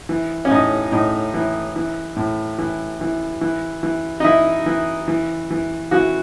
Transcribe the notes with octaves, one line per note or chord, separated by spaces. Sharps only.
E3
C#4
A2 D#4
A2 D#4
E3
E3
A2
E3
E3
E3
E3
D#4
E3 E4
E3
E3
E3
E3 F#4